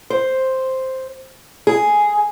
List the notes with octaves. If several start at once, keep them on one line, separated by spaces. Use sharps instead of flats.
C5
G#4